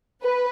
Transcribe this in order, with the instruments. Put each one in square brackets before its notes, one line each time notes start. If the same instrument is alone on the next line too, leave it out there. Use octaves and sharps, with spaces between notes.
[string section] B4